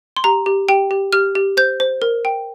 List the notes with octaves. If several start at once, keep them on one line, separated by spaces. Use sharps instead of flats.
C6
G4 A#5
G4
G4 G5
G4
G4 F6
G4
C5 G6
C5
A#4
G5